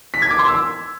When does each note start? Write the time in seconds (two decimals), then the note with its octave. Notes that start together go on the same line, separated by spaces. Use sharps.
0.14 B6
0.22 G#6
0.30 D6
0.39 C6
0.47 E6